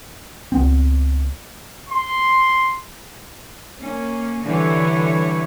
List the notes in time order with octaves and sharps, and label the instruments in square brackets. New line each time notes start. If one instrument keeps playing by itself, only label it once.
[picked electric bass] C#2 B3 C4
[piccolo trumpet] C6
[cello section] A#3 C#4
D3 E3 G3 C#5